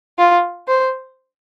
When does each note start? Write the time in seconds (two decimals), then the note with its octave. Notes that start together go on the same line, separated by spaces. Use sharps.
0.19 F4
0.68 C5